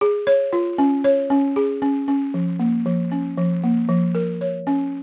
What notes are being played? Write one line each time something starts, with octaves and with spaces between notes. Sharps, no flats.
G#4
C#5
F4
C#4
C#5
C#4
G#4
C#4
C#4
F3
A#3
F3
C#4
F3
A#3
F3
A#4
C#5
C#4